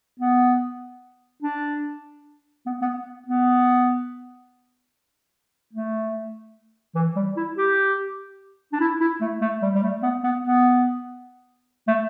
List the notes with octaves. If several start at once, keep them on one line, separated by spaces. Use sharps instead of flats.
B3
D4
B3
B3
B3
A3
E3
G3
E4
G4
D4
E4
E4
A3
A3
G3
G3
A3
B3
B3
B3
A3